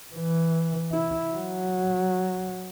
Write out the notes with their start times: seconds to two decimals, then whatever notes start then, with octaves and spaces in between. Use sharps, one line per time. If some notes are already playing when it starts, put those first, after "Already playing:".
0.15 E3
0.92 E4
1.34 F#3